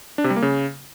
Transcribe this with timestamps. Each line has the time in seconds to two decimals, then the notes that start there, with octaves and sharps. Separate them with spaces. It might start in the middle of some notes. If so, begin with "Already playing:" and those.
0.18 D4
0.24 C3
0.30 G3
0.36 A#3
0.42 C#3